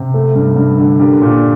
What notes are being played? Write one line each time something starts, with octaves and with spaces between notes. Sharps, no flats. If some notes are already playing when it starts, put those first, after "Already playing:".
Already playing: C3
A3
G2
G2
D3
D4 G4 A#4
A#2